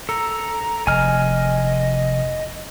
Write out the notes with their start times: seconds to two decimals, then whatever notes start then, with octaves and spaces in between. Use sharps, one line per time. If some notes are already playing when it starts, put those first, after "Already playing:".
0.09 A4 A#5
0.87 F1 D#5 G#5 F6